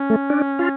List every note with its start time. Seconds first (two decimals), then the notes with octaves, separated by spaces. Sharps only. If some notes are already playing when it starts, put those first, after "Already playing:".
Already playing: C#4
0.10 A3
0.30 D4
0.59 F4